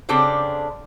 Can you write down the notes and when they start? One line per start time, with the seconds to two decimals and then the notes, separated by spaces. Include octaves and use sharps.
0.09 C#3 C4 D4 G4 A4 C5